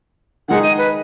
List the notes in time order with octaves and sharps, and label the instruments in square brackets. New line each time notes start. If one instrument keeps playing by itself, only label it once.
[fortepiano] D#3 G#3 D#4 G#4 [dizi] F#5
[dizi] D#5
B4